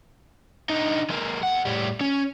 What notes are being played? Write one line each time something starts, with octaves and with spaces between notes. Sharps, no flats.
D3 D#4
G#3 A#3
E2 F#5
A2 G3
C#4